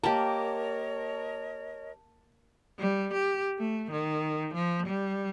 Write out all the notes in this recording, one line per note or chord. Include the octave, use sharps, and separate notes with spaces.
A#3 G4 A#4 C#5 D#5 A5
G3
G4
A3
D#3
F3
G3